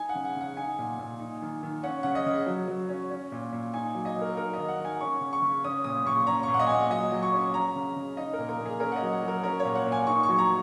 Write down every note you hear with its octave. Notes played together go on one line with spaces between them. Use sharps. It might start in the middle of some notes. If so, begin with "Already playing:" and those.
Already playing: D#4 G#5
F#5
C#3
F#5
C#3 F#5
D#4 G#5
A#2
A#2
D#4
D#3
D#3
C#4 F#5
C#3 F#5
D#5
C#3
F#3
F#3
C#4
C#4
A#2
A#2
D#4 G#5
F#3
D#5
F#3
A#4
D#4 A#4
D#3 D#5
F#5
D#3
G#5
C#4 C#6
C#3
C#6
C#3
C#4 D#6
A#2 D#6
A#2 C#6
C#4 A#5
C#6
A#2
F#5
D#5
A#2 G#5
F#5
F#3 D#5
F#3
C#6
C#4
C#4 A#5
C#3
C#3
D#4 D#5
A#4
A#2
A#4
A#2
G#4
C#4 A#4
F#5
D#5
F#3
F#5
F#3 A#4
C#4 A#4
C#5
A#2
F#5
A#2
G#5
D#4 C#6
C#6
F#3
A#5